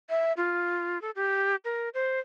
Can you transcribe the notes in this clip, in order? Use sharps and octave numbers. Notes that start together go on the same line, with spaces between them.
E5
F4
A4
G4
A#4
C5